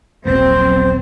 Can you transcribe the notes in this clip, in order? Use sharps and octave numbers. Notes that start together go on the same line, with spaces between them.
D#1 A#1 F#3 A#3 C4 C5